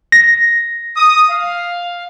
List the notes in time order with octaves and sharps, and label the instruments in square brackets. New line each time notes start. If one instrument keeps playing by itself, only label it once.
[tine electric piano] A#6
[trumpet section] D#6
F5